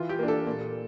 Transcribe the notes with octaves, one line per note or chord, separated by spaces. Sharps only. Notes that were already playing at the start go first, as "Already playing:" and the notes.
Already playing: E3 F4
G4
A#3 D4
A4
A#2